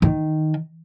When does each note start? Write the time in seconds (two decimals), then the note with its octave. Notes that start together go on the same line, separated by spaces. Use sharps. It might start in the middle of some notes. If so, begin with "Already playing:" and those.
0.02 D#3